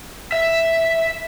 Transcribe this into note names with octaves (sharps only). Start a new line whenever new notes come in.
E5